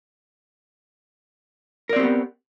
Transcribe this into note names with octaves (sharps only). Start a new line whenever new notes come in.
B3 C4 G4 A#4 D5